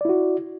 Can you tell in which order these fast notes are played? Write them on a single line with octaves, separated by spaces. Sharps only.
D5 E4 F#4